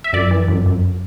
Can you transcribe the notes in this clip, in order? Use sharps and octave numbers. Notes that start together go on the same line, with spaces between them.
E5
F#2 D5
E3
F#2
F#2